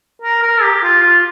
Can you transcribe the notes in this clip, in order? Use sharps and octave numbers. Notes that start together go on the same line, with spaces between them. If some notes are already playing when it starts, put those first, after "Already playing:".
A#4
A#4
G4
F4
F4